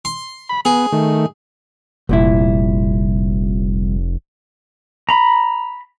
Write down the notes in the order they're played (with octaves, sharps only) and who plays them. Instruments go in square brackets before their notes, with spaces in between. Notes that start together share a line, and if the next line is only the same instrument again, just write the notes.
[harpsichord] C6
[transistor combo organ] B5
[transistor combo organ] B3 [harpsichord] G#4
[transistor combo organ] D#3 A3
[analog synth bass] F1 [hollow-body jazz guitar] C2 A#2 E4
[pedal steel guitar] A#5 B5